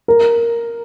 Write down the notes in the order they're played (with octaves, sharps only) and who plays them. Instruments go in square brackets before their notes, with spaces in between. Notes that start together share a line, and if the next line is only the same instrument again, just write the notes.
[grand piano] A#4